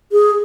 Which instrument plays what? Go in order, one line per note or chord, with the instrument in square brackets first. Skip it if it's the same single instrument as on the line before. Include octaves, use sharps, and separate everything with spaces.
[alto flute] G#4